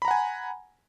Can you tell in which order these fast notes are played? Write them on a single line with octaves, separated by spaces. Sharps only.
B5 A#5 F#5 G#5